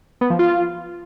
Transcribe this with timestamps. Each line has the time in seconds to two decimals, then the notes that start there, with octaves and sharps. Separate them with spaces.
0.21 B3
0.30 F3
0.39 F4